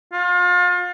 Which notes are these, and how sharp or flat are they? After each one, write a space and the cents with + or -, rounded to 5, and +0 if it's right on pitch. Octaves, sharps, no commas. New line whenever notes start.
F4 +35